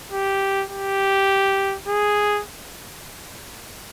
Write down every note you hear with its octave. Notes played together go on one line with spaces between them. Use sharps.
G4
G4
G#4